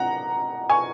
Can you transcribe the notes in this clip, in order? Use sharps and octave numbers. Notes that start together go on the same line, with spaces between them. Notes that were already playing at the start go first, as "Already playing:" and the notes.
Already playing: F#5 A#5
G#5 C#6